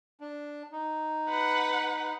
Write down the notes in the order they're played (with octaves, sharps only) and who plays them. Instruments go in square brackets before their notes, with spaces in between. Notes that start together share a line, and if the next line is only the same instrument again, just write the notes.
[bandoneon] D4
D#4
[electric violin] B4 F#5